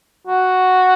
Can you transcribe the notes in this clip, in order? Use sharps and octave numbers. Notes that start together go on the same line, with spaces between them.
F#4